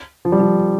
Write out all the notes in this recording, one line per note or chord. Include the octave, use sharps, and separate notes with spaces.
F3
G3
F3